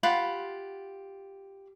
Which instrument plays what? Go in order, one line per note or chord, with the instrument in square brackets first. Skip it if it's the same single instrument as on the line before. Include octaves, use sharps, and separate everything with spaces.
[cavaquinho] F4 G4 F#5 B5